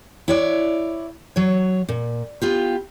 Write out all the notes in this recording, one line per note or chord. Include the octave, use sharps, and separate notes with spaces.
E4 C#5 D5
F#3 C#5
A#2
B3 F4 G4